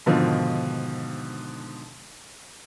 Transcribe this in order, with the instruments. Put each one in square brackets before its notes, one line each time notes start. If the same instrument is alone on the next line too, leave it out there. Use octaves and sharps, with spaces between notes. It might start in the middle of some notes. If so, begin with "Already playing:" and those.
[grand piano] G#2 B2 D3 D#3 F3